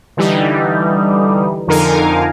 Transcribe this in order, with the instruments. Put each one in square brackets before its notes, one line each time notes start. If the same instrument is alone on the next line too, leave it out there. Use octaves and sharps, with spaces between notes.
[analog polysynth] D3 E3 G3 D#4
F2 D3 D#4 A#4 F5 G#5